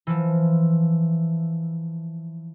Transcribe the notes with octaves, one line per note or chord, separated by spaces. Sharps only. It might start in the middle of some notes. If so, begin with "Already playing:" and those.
E3 F3